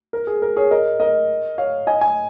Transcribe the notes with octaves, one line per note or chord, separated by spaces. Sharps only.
A#4
G#4
A#4
G#4 C#5
A#4 D#5
A#4 D#5
C#5 F5
D#5 G#5
D#5 G#5